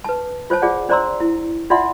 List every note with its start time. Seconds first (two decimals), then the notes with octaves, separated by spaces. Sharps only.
0.04 B4 A5
0.50 F4 C5 C#5 A5
0.62 F4 G#4 D5 F#5
0.89 D4 C5 D5 A#5 C6 E6
1.20 E4
1.70 D#4 F4 D5 E5 F#5 C6